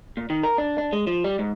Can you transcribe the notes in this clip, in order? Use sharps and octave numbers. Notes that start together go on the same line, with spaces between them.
A#2
D#3
A#4
D4
D4
G#3
F3
G3
G#2